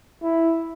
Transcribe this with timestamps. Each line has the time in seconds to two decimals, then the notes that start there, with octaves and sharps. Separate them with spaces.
0.22 E4